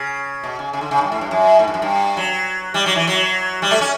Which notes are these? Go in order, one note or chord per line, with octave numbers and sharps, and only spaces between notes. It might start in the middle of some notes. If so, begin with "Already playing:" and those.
Already playing: C#3
B2
C#3
C#3
D3
C#3
G2
A2
G2
F#2
A2
G2
F#2
G2
F#3
G3
F#3
E3
F#3
G3
A3
C#4